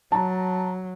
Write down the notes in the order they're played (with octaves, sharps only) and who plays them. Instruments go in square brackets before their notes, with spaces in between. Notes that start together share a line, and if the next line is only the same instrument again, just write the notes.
[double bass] F#3 [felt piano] A5 A#5